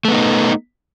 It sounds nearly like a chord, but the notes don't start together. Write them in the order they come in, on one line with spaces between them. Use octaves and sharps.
A3 B3 D#4